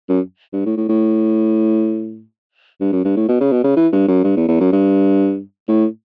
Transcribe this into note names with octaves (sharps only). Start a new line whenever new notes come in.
F#2
G2
A2
A2
A2
G2
F#2
G2
A2
B2
C#3
B2
C#3
E3
G2
F#2
G2
E2
E2
F#2
G2
A2